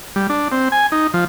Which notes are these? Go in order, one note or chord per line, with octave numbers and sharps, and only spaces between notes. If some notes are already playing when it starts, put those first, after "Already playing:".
G3
D4
C4
G#5
D#4
F3